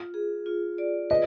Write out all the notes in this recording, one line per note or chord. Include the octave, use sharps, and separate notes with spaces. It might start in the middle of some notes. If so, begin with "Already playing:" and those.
Already playing: F4
G#4
F4
D5
B4 D#5